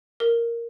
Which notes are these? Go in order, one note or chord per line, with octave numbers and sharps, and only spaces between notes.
A#4